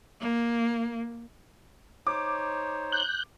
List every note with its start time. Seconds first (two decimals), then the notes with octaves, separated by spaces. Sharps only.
0.20 A#3
2.07 D#4 C5 C#5 D6
2.92 F#6 G6